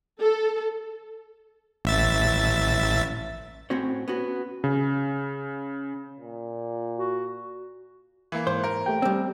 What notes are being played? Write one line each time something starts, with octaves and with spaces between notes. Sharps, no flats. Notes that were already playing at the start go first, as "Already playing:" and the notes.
A4
A1 E5 A6
A2 C4 C#4 F#4 C#5
B3 C#4 F#4
C#3
A#2
F#4
E3 A#3
G#2 C5
A#4
A3 G4 G5
G3 C4